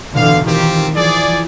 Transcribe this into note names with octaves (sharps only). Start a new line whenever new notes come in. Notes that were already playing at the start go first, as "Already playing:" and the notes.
B2 D3 E3 F5
D#3 C4 F4 G4
E3 F3 G#4 D5